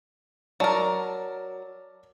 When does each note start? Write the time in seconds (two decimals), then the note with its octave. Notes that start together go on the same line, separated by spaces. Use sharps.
0.60 F#3 A#4 D5 A5